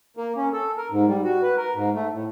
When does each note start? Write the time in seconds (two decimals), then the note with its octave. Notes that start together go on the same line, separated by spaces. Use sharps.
0.17 A#3
0.36 C#4
0.53 A4
0.77 A#4
0.91 G#2
1.07 G3
1.24 F#4
1.42 B4
1.57 A#4
1.75 G#2
1.95 A3
2.12 A2